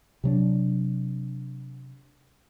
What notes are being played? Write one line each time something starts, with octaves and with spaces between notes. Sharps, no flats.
C3 F#3 D4